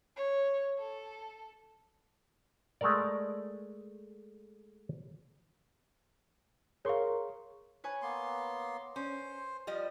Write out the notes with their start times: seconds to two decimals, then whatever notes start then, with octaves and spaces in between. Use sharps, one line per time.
0.16 C#5
0.78 A4
2.81 G#3 A3 A4 A#4 D5
6.85 G#4 A#4 C#5 F5 C6 C#6
7.84 B4 C#5 G#5
8.02 A#3 B3 C6
8.96 C#4 C5
9.67 F3 G3 D#5